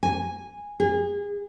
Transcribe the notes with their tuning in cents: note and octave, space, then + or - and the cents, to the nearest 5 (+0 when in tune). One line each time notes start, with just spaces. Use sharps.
G#5 -10
G#4 -30